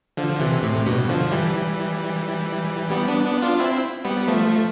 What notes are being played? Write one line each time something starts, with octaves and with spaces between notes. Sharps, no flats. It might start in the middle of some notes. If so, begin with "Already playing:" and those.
D3 F3
C3 E3
A2 C3
G2 B2
D3 F3
E3 G3
G3 B3
B3 D4
B3 D4
D4 F4
C4 E4
G3 B3
F3 A3